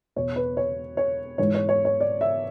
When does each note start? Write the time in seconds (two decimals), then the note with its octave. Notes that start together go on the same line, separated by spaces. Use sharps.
0.16 E2 B2 C#5
0.36 B4
0.57 C#5
0.97 C#5
1.38 G#2 E3 C#5
1.55 C#5
1.69 C#5
1.85 C#5
2.01 D5
2.21 E5